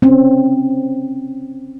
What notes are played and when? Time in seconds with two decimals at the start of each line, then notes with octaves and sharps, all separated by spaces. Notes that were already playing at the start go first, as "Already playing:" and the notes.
0.02 C4 C#4